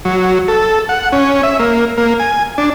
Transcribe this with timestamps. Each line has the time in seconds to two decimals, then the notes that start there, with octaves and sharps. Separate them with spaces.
0.05 F#3
0.48 A4
0.89 F#5
1.12 C#4
1.43 E5
1.59 A#3
1.98 A#3
2.20 G#5
2.58 D4